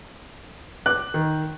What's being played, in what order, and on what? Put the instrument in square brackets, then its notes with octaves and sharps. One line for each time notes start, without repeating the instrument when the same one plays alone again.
[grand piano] D6 [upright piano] F#6
[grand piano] D#3